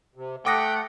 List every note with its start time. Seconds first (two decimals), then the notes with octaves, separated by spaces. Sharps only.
0.16 C3
0.46 A3 F#5 G5 D6 D#6 A#6